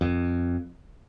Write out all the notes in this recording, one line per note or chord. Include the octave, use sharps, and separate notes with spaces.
F2